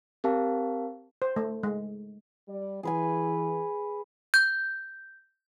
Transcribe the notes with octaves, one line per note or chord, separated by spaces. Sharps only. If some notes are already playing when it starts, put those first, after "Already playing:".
C4 G4 A#4 F5 A5
C5
A3
G#3
G3 D5
E3 G#4 B4 G#5
G6